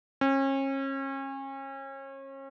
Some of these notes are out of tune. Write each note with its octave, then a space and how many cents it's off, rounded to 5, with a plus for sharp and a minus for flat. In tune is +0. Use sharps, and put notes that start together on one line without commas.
C#4 -35